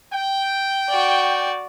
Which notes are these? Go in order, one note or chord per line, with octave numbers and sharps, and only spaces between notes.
G5
F#4 D5